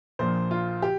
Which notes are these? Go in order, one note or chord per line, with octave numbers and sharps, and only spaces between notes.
A#1 A#2 F3 C5
F4
G4